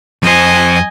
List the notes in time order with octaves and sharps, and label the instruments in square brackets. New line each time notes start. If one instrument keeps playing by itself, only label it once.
[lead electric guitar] F2 C5 [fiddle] D#5 G#5